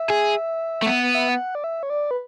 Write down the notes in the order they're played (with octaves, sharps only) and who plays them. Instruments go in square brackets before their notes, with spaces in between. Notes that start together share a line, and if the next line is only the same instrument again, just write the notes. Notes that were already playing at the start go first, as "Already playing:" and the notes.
Already playing: [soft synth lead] E5
[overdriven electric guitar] G#4
A3
B3
[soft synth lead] F#5
E5
F#5
D5
E5
C#5
D5
B4